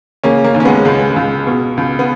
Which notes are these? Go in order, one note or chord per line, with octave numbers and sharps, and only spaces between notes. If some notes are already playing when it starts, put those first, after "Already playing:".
C#3 A#3 C#4
A#3
D#2
C#4
G#3 B3
C#2 G#3
G#3
C#2
B2
C#2
B3